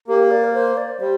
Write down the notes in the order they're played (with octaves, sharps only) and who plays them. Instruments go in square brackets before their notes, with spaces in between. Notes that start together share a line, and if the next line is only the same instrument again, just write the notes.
[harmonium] A#3 [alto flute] G4
[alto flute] D5
A#4
C5
D5
[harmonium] G3 [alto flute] C5